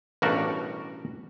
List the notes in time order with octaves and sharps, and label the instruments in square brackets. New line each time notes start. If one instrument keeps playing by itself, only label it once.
[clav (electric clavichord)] A1 G2 B2 G3 F#4 A#4